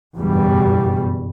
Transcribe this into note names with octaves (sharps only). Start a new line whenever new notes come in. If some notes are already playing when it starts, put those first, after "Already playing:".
F#1 E2 G2 B2 G3